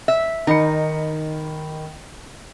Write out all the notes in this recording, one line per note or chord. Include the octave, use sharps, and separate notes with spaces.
E5
D#3 D#4 B5 C#7